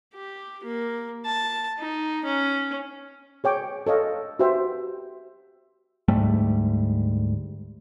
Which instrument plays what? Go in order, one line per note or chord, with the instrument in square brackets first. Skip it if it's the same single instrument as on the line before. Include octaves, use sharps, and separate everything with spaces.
[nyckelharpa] G4
A#3
A5
D#4
C#4
[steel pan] G#4 C#5 G5 D6
A4 C#5 D#5 F5
F#4 G4 B4 C5 E5 G5
[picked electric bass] D2 G#2 G3 A3